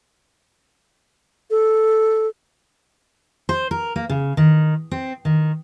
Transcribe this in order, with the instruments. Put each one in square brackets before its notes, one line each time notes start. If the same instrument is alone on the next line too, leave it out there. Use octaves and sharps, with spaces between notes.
[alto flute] A4
[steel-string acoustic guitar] C5
A#4
A#3
C#3
D#3
C4
D#3